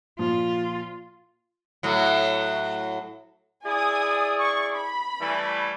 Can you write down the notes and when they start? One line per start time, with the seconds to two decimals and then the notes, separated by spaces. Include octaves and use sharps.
0.19 A#2 F3 F4
1.83 A2 F#3
3.65 E4 G#4 D5 G#5 D#6
4.40 C#6
4.77 B5
5.21 E3 G3 A3